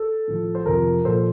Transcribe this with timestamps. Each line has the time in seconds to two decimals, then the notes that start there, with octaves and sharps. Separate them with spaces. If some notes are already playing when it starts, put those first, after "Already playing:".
Already playing: A4
0.28 A2 F3
0.55 C5
0.66 F2 C3 F3 A#4
1.05 A#2 F3 A4 C5